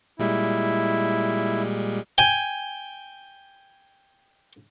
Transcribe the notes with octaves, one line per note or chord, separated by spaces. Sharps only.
A#2 G3 G#3 E4
G5 G#5